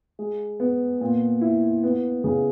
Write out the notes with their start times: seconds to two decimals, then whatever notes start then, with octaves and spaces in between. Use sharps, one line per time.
0.19 G#3
0.60 B3
1.01 A#2
1.41 E4
1.83 B3
2.24 C#3